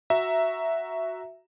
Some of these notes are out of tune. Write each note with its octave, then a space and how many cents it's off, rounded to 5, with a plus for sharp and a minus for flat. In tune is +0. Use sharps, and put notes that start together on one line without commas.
F#4 +0 E5 +0 A#5 +0